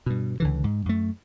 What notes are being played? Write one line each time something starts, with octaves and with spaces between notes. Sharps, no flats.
G2 B2
C#2 D3 E3
G#2
F#2 A3